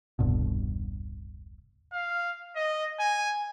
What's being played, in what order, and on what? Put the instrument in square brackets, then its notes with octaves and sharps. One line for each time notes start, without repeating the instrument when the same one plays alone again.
[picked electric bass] E1 C2 G2 B2
[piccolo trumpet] F5
D#5
G#5